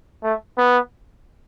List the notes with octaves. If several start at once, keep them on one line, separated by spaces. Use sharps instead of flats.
A3
B3